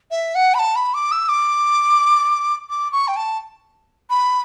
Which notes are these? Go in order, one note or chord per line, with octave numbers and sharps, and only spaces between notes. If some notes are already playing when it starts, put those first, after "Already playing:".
E5
F#5
B5
A5
B5
D6
E6
D6
D6
C#6
G5
A5
B5